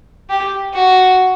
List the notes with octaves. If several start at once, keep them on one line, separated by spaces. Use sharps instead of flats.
G4
F#4